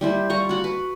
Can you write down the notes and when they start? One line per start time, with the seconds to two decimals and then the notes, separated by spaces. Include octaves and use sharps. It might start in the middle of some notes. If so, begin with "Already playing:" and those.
0.01 G3 E4 C5
0.30 G3 F4 A#5 C#6
0.49 F#4 F#5
0.64 B4